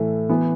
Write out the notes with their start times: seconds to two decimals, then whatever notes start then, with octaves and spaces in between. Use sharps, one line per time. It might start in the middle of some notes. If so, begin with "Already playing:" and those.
Already playing: A2 E3 A3
0.29 E3 B3